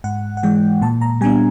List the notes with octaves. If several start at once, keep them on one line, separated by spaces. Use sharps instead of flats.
G#2 F#5
F#5
E3 G#3 G5
A#2 A5
A#5
G3 B3 D4 G#5